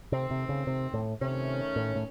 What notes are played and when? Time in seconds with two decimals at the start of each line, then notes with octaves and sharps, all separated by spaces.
0.12 C3 D#3 A3 C4
0.31 C3
0.49 C#3
0.67 C3
0.94 A2
1.21 C3 D#3 A3 C#4
1.76 A2
1.95 A2